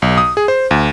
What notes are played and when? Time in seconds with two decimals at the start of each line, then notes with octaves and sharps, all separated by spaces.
0.02 B1
0.18 D#6
0.37 G#4
0.48 C5
0.71 D2